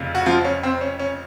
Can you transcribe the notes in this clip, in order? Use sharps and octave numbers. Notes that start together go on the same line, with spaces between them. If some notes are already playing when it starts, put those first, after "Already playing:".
Already playing: F1 F2 C#3
F#4
F3 F4
C#4
C4
C#4
C#4